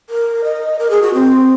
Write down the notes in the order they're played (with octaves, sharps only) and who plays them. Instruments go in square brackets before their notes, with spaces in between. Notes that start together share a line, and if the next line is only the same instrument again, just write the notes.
[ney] A#4
D#5
A#4
G#4
F#4
C4